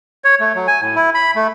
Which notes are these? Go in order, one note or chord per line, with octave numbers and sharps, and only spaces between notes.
C#5
A3
F#3
G#5
A2
E4
B5
A3